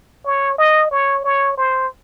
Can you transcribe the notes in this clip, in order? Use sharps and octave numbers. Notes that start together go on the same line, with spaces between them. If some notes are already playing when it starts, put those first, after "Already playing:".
C#5
D#5
C#5
C#5
C5